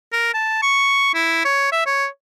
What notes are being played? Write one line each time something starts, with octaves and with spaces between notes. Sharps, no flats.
A#4
A5
C#6
E4
C#5
E5
C#5